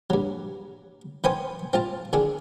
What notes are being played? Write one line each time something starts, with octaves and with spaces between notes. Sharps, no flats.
G2 F#3
D#3 B3 C5 G5 G#5 D#6
C4 F4 A5
D3 D#3 D4 G#4